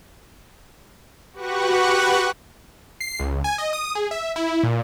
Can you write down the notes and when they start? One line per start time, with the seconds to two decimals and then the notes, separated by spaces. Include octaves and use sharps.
1.33 F#4 G4 B4 F#5 C#6 F#6
3.01 C7
3.20 C#2
3.44 G#5
3.58 D#5
3.73 D#6
3.95 G#4
4.11 E5
4.36 E4
4.63 A#2